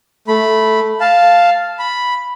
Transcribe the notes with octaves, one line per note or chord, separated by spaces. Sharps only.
A3 B5
F5 A5
B5